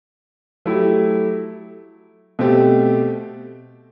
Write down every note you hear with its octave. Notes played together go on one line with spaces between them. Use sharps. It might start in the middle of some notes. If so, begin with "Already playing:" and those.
F#3 A3 E4 G4
B2 A3 C4 G4